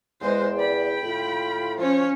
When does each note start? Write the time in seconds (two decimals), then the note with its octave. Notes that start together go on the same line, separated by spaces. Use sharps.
0.21 E2 G#3 B4 C5
0.56 D5 G5 B5
1.02 A2 F4
1.78 F3 C#4 C#5